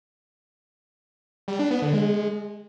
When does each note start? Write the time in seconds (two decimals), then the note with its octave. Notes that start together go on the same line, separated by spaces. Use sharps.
1.48 G3
1.59 D4
1.71 B3
1.82 D3
1.94 G#3